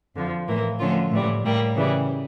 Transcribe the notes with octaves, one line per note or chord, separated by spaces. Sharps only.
F2 D3 F3
A2 E3 A#3
D3 F3 A3 C#4 F4
A2 E3 G3
A2 G3 A#3
C#3 E3 G3